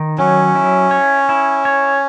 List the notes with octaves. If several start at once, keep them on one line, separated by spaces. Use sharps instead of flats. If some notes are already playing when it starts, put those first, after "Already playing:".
Already playing: D#3
F#3 C#4
E4
C#5
E4
C#5